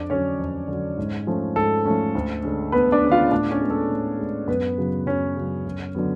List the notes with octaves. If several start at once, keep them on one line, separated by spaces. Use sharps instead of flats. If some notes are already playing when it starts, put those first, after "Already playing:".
Already playing: F2 D4 D5
D3 F#3 C#4 C#5
F2
D3 F#3
G#2
F3 A3 C#4
G#2 A4
F3 A3 C#4
D2
D3 G#3 C#4
D2 B3 B4
D4 D5
D3 G#3 C#4
F4 F5
A2 D4 D5
C#4 C#5
G#3 B3
A4
A2
G#3 B3
F#2 B3 B4
C#3 F#3
F#2 C#4 C#5
C#3 F#3
F#2
D3 F#3 B3